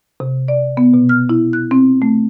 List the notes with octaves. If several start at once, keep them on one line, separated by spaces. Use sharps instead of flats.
C3
D5
B3
B2
F6
E4
F#6
C4
A3